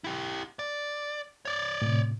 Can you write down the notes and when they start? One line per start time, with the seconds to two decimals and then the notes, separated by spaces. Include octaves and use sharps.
0.04 E4 G4
0.59 D5
1.45 C#5 D5
1.82 A2 C3